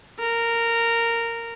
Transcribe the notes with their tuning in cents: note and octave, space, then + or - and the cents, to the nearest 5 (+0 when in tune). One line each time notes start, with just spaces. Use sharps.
A#4 -10